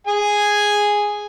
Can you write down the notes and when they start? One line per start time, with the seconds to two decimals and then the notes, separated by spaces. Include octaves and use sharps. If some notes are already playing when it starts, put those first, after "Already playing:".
0.07 G#4 G#5